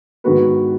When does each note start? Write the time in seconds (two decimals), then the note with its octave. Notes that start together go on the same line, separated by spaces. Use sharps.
0.24 G#2 D#3 B3 F#4 B4